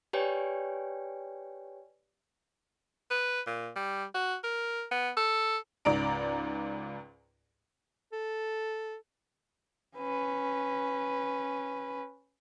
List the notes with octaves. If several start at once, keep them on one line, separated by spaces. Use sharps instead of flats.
G4 B4 C#5 D5 G5 G#5
B4
A#2
G3
F#4
A#4
B3
A4
C#2 G#2 D5 A#5 D7
A4
C#4 B4